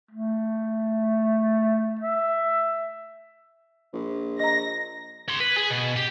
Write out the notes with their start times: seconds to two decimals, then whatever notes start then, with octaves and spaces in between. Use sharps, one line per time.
0.11 A3
2.00 E5
3.93 A#1
4.39 D#5 A#5 A#6
5.29 C#5 C6
5.40 B4
5.57 G#4
5.70 B2
5.96 G4